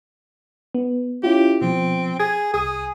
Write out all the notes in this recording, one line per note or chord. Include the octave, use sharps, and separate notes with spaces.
B3
C#4 E4 F4 G4
B2 F3 C4
G#4 G#6
C2 G#4 D#6